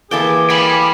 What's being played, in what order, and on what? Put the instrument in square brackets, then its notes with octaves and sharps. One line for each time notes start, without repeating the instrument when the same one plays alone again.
[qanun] E3 A4 G5 [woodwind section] A#3 G#4 [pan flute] D6
[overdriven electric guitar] G5 B5 [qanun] G#5